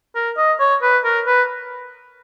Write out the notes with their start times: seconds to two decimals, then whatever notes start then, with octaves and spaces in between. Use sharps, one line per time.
0.15 A#4
0.37 D#5
0.60 C#5
0.82 B4
1.05 A#4
1.27 B4